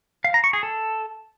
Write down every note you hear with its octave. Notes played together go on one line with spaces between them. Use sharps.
F5
A#5
C#6
G#4
A4